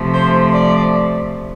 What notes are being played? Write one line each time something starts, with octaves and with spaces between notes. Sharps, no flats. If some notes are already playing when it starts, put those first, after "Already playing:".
Already playing: C3 F3 A3
C5
D5